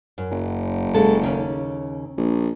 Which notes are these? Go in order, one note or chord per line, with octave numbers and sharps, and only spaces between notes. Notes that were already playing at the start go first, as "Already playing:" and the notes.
F#2
F#1
C#3 G#3 A4
D#2 C#3 C#4
A#1